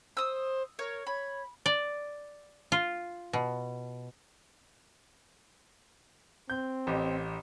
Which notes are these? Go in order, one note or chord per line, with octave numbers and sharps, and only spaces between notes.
C5 D#6 E6
A#4 C#5
C#5 B5
D5
F4
B2
C4 G6
A1 G4 D#5